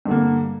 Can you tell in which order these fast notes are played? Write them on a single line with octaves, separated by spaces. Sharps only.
G2 D3 A#3